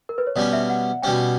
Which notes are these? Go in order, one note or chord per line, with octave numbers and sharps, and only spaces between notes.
A#4
B4
C#5
B2 G3 C#4 D5
E5
F#5
B2 G3 C#4 G5